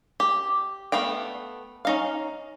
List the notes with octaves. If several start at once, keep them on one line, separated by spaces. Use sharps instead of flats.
G4
A3 B3 F5 G5
C#4 D#4 F5